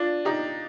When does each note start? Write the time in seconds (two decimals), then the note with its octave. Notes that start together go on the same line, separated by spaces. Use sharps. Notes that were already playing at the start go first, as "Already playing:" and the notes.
Already playing: D4 F4
0.25 D#4 G4